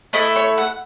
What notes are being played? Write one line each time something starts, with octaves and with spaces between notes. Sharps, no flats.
A3 E4 A4 D#5
C#5
F#5